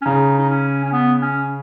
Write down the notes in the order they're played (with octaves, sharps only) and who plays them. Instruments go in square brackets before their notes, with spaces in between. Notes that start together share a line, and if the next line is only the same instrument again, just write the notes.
[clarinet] C#4
[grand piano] C#3 [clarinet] D#4
[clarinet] D#4
C#4
C#4
B3
C#4